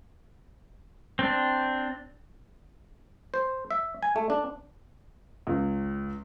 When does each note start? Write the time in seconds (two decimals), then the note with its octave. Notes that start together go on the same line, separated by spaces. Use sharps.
1.19 C4 D4
3.34 C5
3.71 E5
4.03 G#5
4.16 A3
4.30 D4
5.47 C#2